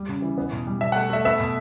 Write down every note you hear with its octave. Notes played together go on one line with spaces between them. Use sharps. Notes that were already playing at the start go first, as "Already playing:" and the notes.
Already playing: G3
C#3
E3
B3
B2
G3
B2 E5
A3 F#5
A3 E5
B3 E5
B2